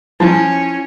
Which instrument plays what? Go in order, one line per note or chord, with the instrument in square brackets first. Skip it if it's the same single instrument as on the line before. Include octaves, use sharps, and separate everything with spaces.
[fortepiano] F3 [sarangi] C#4 [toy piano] E4 G#5